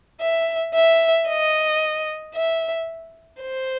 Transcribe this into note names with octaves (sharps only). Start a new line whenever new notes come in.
E5
E5
D#5
E5
C5